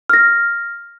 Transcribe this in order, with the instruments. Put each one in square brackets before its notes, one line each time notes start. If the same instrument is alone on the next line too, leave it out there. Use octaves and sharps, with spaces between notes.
[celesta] F6 A#6